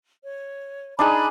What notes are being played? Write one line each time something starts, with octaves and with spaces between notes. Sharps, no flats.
C#5
D4 D#4 G#4 G#5 B5 F#6